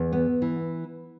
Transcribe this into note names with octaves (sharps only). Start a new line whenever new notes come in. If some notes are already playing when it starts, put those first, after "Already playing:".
Already playing: E2
B3
E3